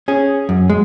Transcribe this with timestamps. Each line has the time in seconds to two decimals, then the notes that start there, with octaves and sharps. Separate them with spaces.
0.08 C#4 G#4
0.49 F#2
0.70 G#3